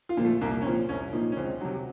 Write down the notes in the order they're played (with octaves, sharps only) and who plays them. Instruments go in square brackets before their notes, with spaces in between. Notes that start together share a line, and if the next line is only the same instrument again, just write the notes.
[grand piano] F4
A#2 F3
A3
C2 A#3
C#4
A#2 C4
F3
C2 C#4
A#2 F3 D#4
C#4
C#2 C4
C3 F#3